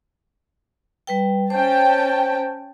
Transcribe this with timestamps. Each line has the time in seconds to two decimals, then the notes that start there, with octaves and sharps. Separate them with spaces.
1.07 G3 B4 G5
1.50 C#4 C5 G5 A5